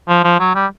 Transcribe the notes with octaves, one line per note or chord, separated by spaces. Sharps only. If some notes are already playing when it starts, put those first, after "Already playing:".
F3
F3
F#3
G3